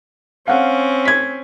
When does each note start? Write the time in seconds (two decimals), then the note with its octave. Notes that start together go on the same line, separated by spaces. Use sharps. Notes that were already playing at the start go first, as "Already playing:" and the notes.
0.48 C4 C#4 F5 F#5
1.05 G#6 B6